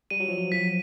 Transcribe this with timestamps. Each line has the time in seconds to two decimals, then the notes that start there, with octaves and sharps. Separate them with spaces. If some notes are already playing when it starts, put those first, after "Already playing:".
0.10 G3 D#7
0.20 F#3
0.28 F3
0.38 F#3
0.52 F3 B6